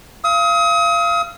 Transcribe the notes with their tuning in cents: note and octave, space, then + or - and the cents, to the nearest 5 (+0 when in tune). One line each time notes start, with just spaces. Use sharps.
F5 -30 D#6 +35